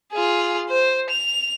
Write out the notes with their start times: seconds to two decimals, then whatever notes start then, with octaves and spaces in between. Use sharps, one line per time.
0.12 F4 G#4
0.69 C5
1.10 F7